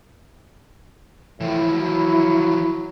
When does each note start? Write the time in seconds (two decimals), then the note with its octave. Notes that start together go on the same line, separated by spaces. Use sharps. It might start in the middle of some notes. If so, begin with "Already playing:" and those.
1.41 A2 E3 F3 E4
1.74 F#3